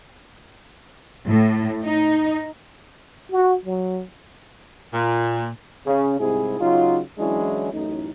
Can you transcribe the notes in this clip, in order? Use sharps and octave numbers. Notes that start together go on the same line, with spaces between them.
A2
D#4
F#4
F#3
A#2
C#3
C2 G#2 C3 E4 G#4
C#3 F#3 D#4 F4
E3 F#3 G#3 C#4 D4 E4
A1 F#2 A2 D#4